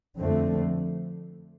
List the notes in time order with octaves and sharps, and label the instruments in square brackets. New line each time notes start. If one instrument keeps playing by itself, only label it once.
[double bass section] F2 D3 A3 C4